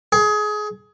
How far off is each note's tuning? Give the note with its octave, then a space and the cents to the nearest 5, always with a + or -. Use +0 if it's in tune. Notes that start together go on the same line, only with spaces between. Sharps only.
G#4 +25